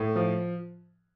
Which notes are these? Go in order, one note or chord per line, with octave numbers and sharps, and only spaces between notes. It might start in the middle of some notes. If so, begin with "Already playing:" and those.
Already playing: A2
F3